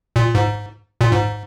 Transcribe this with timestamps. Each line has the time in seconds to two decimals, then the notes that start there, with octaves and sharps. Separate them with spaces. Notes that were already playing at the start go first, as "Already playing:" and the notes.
0.16 A#2
0.35 G#2
1.01 A#2
1.11 G#2